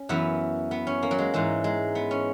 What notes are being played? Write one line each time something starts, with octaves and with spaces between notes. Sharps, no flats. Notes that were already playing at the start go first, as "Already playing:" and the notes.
Already playing: C#4
F#2 E3 B3
B3
C#4
A#3
F#3
G#3
G#2 E3 G#3
G#3
B3
C#4